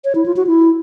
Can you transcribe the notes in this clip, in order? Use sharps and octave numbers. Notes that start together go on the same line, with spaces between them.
C#5
E4
F4
F#4
E4